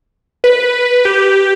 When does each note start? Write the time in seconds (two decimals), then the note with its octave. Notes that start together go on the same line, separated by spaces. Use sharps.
0.44 B4
1.05 G4